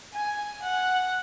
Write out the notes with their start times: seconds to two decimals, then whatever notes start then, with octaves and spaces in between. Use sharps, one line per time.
0.13 G#5
0.63 F#5